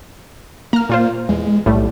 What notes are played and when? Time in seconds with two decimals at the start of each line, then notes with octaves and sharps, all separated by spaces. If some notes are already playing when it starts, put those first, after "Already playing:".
0.73 A#3 A#5 F6
0.89 A#2 F4 C5
1.29 E2 G#3
1.66 B1 A2 G3 A3